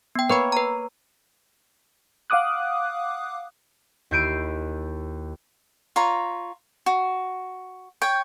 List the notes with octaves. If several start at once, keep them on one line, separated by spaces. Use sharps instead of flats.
B3 G5
A#3 B4 C#5 B5
B4 A#5
F5 F#5 D6 D#6 F#6
D#2 E4 G6 C7 D7 D#7
F4 C#5 A#5 B5
F#4
C#5 G5